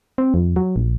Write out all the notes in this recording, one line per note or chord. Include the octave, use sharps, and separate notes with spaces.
C4
F2
F#3
A#1